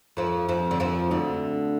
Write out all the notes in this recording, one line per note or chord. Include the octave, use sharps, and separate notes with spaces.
F2 F3
F2 F3
D3
F2 F3
D2 D3